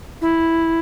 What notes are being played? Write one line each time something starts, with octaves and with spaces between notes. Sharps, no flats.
E4